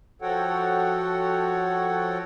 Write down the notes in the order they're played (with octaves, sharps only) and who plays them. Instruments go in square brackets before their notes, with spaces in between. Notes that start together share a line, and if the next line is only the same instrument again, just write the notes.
[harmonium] F3 F#4 A4 C#5 F#5 G5